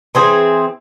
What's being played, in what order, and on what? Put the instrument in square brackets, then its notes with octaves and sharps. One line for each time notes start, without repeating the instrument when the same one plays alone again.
[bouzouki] E3 C4 G#4